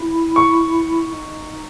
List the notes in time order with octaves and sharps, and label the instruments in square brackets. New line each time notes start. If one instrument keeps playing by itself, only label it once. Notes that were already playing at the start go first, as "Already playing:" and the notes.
Already playing: [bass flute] E4
[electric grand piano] C#6
[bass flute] D#4